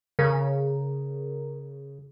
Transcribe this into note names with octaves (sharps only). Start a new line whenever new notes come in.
C#3 A#4